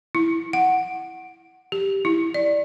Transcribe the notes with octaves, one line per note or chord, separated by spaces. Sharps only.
E4
F#5
G4
E4
D5